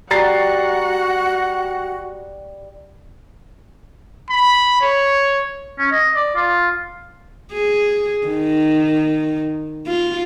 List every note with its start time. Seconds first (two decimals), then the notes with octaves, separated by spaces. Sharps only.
0.11 G3 F#4 F#5 A#5 A6 C7
4.30 B5
4.81 C#5
5.79 C#4
5.91 D#5
6.15 D5
6.35 F4
7.52 G#4
8.27 D#3
9.87 F4